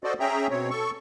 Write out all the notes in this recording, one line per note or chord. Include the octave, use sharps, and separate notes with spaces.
F#4 A4 C5 D5 D#5
C#4 G#4 E5 G5 A#5
B2 C4 C#5
A4 C#6